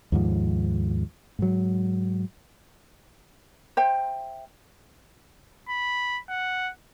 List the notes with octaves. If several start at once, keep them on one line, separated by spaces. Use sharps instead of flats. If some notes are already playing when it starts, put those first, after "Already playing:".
D#2 G#2 F3
G#2 F#3
C5 E5 G5
B5
F#5